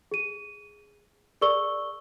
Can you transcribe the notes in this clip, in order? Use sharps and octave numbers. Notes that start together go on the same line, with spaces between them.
G#4 D#7
G#4 A#4 D5 C#6 E6 G7